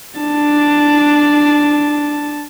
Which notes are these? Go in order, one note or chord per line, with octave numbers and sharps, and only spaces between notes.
D4 A5